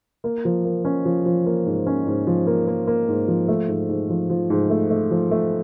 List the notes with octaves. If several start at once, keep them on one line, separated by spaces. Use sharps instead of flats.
A#3
F3
A#3
C#4
F3
F3
A#3
G#2
C#4
G#2
F3
A#3
A#3
A#3
G#2
F3
A3
G#2
G#2
F3
F3
G#2
A3
A3
F3
A3